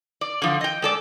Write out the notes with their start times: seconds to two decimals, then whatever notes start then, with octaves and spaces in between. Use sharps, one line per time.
0.21 D5
0.42 D3 F3
0.61 D#5 G5
0.82 G#3 A4 D5